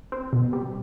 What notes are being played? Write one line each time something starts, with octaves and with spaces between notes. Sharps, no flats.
C4
B2
G3